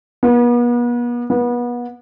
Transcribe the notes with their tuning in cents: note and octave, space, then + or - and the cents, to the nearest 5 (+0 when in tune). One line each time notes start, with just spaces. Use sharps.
B3 -40
B3 -30